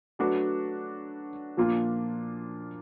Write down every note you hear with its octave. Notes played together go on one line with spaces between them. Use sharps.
F#3 A3 D4 F#4 B4
A#2 F3 A#3 D4 F4